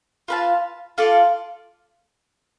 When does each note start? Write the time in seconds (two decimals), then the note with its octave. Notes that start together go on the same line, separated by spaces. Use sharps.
0.28 F4 B4 F5 A5
0.98 F4 A4 D5 F5